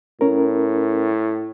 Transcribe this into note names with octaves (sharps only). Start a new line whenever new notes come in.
A2 C#4 A#4